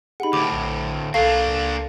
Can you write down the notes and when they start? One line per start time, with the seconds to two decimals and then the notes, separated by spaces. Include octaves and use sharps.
0.20 D#4 G4 G#4 F#5 B5
0.33 D2 A2 D6
0.52 A#1
1.14 C2 A#3 D4 A4 F5 A5 C#6
1.48 C#2